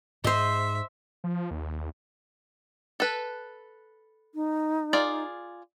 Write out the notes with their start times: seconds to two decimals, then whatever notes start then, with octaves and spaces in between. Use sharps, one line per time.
0.24 G#2 C5 D#5 E5
1.24 F3
1.51 D#2
3.00 A4 B4
4.35 D#4
4.93 F4 G#4 D5